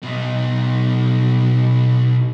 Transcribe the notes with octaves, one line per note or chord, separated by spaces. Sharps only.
B2 D#4